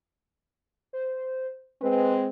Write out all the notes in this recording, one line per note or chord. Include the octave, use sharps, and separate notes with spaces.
C5
G#3 C4 B4